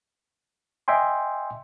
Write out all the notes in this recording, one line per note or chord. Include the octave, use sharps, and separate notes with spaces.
D#5 E5 G5 G#5 C6